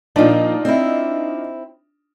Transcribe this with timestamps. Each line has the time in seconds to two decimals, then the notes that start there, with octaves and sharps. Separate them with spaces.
0.16 A#2 F3 D4 D#4 F4
0.65 C4 E4